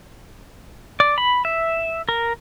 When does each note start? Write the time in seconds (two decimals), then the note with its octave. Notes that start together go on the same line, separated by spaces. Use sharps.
1.00 D5
1.18 B5
1.45 E5
2.09 A#4